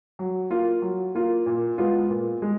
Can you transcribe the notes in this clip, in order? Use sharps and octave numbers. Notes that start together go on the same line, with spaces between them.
F#3
A#3 F4
F#3
A#3 F4
A#2
G#3 B3 F4
A#2
G#3